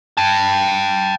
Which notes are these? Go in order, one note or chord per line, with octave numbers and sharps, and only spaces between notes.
G5 A5